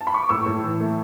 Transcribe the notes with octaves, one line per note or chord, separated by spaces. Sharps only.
A5
B5
C#6
D6
A2 C#6 E6
A2
E3
A3